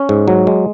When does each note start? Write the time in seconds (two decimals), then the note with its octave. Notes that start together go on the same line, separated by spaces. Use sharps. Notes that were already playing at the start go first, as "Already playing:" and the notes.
Already playing: C#4
0.09 G#2
0.28 F#3
0.47 G#3